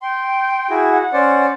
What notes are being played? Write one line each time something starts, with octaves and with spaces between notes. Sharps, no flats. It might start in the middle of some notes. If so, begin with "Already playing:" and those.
G5 C6
E4 F#4 G#4
F#5
C#4 C5 D5